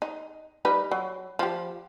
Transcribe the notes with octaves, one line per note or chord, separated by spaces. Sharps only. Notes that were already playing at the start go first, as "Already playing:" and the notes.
D#4
G3 D#4 B4
F#3
F3 G4